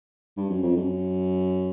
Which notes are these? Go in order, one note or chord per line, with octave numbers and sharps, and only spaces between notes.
G2
F#2
F2
F#2